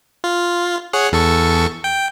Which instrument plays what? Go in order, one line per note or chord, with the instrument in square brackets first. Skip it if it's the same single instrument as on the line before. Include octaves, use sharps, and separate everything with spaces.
[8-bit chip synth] F4
G#4 C#5 F#5
E2 A4 C#6
G5